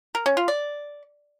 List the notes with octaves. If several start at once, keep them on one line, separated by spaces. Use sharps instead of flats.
A#4
C#4
F4
D5